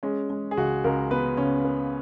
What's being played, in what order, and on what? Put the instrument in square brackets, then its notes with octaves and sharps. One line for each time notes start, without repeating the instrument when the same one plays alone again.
[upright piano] G#3 C#4
G#3
G#4
C#2 F#4
C#2 A#4
B3 B4
C#3 C#4
B3